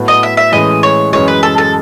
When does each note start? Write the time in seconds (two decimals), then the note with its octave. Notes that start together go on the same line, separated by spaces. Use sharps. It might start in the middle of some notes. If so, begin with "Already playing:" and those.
Already playing: A2 F#3 B3 F#4 A4
0.08 D#5
0.23 E5
0.37 E5
0.52 A2 E3 G#3 C#4 D#5
0.83 C#5
1.13 F#2 E3 G#3 C#5
1.28 B4
1.43 A4
1.58 A4